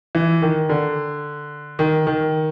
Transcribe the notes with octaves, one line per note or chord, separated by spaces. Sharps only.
E3
D#3
D3
D#3
D#3